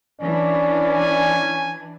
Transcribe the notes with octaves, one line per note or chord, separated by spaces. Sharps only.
E3 C#4 D4 D5
G#5